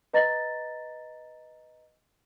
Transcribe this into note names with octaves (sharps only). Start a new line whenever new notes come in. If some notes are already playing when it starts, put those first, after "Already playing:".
B4 D#5 A#5 A6 A#6